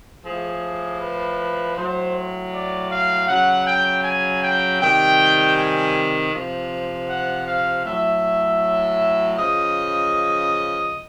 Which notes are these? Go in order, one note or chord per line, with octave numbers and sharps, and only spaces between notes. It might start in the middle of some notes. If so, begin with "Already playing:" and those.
A2 F3 G#4
B4
A2 F#3 C5
D5
F5
C#3 F#3 F#5
G5
G#5
G5
C3 D#3 G3 G5
G#5
C3 F3
F#5
F5
A2 F#3 E5
C#3 F3 D#5